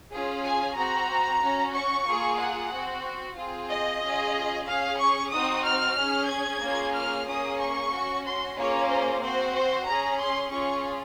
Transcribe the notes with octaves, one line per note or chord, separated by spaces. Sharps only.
C#4 F4 G#4
G#5
C4 F#4 A#5
C#4 F#4
C#6
A#3 F4 G#4
F#5
C4 F#4
C4 F4 G#4
D#5
C#4 F4 G#4
C#4 G#4 F5
C#6
C4 D#4 F#4 D#6
F6
C#4 G#4
G#6
A#3 C#4 F4 G#4
F6
A#3 C#4 G#4 D#6
C#6
C#4 F#4
C6
A#3 C#4 F4 G#4 C#5
C5
C4 F#4 C5
C5
C#4 G#4 A#5
C6
C#4 F4 G#4 C#6